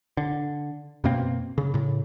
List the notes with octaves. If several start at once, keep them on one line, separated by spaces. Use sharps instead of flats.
D3
F#2 B2 A#3 C4
C#3
A2 C#3